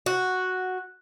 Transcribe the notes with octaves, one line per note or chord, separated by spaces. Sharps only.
F#4